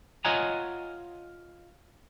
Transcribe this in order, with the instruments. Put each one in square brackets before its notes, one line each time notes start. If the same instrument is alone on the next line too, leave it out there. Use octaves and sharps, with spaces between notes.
[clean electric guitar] F4 C#5 D#5 F#5 G#5 A#5